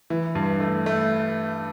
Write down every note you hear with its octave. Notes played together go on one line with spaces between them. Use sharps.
E3
G2
A3
A3